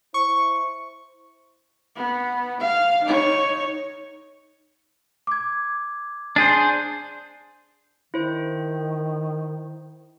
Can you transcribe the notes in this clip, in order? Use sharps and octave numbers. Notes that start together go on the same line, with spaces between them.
E4 C5 C#6
B3
F5
D#4 C#5
D6 G#6
D4 G#4 C5
D#3 E4 C5